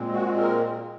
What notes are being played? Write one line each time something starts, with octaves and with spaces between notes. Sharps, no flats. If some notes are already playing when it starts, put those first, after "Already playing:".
Already playing: A#2 G#3 C4
F#4
A#4